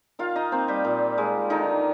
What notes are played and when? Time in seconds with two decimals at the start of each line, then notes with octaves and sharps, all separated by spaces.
0.19 D#3 F4 F5
0.36 D#4 D#5
0.52 A#3 C4 C5
0.68 G3 G4
0.85 A#2
1.18 G#3
1.50 D3 D#3 D#4